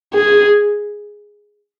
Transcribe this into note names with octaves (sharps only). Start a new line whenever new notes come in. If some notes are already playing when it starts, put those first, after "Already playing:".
G#4